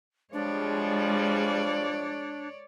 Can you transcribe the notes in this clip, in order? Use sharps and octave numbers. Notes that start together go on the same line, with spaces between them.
F3 G3 G#3 D4 C#5 D5